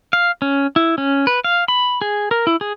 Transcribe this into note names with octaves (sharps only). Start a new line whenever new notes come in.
F5
C#4
E4
C#4
B4
F5
B5
G#4
A#4
E4
G#4